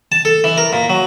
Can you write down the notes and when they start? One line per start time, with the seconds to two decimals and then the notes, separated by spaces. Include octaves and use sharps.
0.12 A5
0.25 A4
0.44 E3
0.58 A#4
0.73 A#2
0.90 F#3